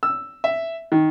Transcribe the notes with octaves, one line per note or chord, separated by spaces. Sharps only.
E6
E5
D#3